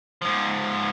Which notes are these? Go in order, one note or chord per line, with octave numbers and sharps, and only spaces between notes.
G#2 F3